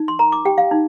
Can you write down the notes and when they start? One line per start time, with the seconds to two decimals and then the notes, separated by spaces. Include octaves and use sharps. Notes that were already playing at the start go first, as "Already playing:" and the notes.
Already playing: D#4
0.08 C6
0.19 A#4 A#5
0.32 D6
0.45 G4 G5
0.58 F5
0.71 D#4